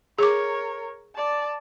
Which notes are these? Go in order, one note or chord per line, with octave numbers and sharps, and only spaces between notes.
G#4 A#4 C#5 D6
D5 A5